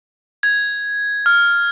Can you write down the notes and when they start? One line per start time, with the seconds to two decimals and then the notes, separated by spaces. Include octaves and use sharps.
0.43 G#6
1.26 F6